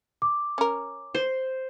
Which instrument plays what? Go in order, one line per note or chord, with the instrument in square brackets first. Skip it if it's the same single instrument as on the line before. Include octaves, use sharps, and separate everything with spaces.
[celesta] D6
[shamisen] C#4 A#4
[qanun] C5